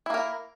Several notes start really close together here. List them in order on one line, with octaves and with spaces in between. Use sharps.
E4 A#3 A#4